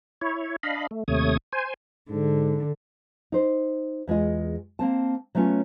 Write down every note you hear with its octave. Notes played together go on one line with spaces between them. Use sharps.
E4 C#5
D4 D#5 F5 B5
A3
D#2 C3 A3 C#5 D#6 G#6
C5 G#5
G#2 D3
D#4 C5
E2 G#3 F4 D#5
A#3 C4 A5
F#3 A3 B3 C#4 F4